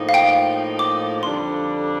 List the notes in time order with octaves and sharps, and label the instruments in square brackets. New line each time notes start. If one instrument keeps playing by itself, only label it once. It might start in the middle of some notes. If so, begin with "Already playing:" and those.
Already playing: [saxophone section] A2 F3 A#3 D#4
[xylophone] F5
G5
D6
[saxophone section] F2 D3 G3 D4 [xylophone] C6